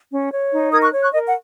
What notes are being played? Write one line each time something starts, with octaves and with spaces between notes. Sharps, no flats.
C#4
C#5
D#4
A#4 D#6 G#6
C#6 F#6
C#5
C#6 F#6
A#4 D#5
F#5